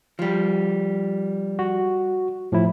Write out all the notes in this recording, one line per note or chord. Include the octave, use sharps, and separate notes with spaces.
F3 G3
F#4
A2 F3 E4